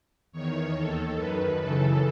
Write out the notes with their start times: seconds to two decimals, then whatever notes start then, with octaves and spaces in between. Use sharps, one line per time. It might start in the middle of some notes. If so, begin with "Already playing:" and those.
0.32 E2 D#3 C#5
0.74 D#2 D#3 A4
1.16 F#2 D#3 B4
1.59 F#2 C#3 E3 A4